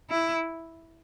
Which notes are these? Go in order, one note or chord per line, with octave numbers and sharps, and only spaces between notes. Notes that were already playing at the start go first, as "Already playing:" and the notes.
E4